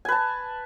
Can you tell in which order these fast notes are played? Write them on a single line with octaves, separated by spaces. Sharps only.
G#5 B4 A5